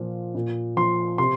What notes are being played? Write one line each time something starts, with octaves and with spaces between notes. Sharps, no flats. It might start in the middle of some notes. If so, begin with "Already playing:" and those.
Already playing: A#2 F3
A#2
F3 C6
C3 C6